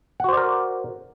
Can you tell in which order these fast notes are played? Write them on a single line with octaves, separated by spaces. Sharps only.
F#5 F#4 C5 D5 A#4